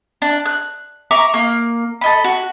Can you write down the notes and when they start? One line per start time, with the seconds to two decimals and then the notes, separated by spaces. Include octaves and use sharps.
0.22 D4
0.45 F#6
1.11 E5 A#5 C#6 D6
1.34 A#3
2.01 A4 D#5 B5
2.24 F#4